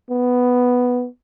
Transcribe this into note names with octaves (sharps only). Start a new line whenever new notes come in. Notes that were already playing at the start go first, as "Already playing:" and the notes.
B3